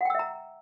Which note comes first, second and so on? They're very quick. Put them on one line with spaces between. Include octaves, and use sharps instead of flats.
F#5 G5 E6 E5 A#5